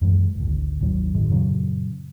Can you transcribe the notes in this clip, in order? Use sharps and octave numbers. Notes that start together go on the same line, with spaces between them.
F#2 E3 G#3
G#1 D2
G#1 D#2 F#3
G#2 D#3
F#2 A#2 C#3 F#3